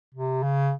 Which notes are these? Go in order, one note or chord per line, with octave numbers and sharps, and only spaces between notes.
C3
C#3